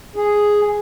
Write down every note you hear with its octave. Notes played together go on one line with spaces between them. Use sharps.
G#4